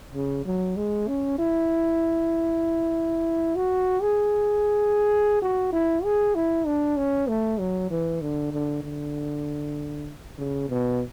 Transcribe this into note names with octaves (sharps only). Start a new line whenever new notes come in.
C#3
F#3
G#3
C#4
E4
F#4
G#4
F#4
E4
G#4
E4
D4
C#4
A3
F#3
E3
D3
D3
D3
C#3
B2